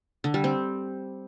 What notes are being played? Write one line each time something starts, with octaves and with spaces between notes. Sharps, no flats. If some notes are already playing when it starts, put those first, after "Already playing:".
D3
G3
C4